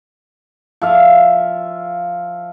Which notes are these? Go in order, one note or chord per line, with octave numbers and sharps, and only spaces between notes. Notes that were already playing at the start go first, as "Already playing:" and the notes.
F3 E5 F5